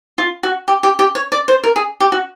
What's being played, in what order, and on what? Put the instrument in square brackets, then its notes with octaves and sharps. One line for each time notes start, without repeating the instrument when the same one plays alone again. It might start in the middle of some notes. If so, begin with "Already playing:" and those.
[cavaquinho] F4
F#4
G4
G4
G4
C#5
D5
C5
A#4
G#4
G4
F#4